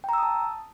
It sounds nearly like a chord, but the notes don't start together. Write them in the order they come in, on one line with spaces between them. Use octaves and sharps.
G5 A#5 E6 D#6 A5